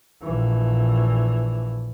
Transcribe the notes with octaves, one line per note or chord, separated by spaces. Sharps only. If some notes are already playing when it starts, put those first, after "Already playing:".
A#1 E3